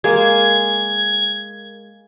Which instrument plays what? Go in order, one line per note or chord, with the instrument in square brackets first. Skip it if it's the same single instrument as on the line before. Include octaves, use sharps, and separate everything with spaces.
[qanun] G#3 A#3 [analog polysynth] G#6